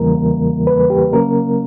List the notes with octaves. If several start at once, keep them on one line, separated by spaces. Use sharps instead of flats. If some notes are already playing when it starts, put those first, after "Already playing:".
Already playing: E2 C#3 E3 G3 A#3 A#4
B4
G4
C#3 F#3 A#3 C#4 A#4